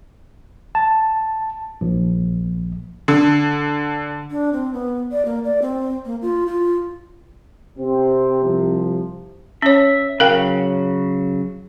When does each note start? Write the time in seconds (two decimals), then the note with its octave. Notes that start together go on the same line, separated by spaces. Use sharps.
0.75 A5
1.81 A#1
3.08 D3
4.30 D4
4.53 C4
4.73 B3
5.12 D5
5.25 A#3
5.44 D5
5.62 C4
6.05 A#3
6.22 F4
6.47 F4
7.78 C3 C4
8.43 C2 F3
9.62 C#4 C#5 E5
10.20 C#3 F#3 A#4 F5 G5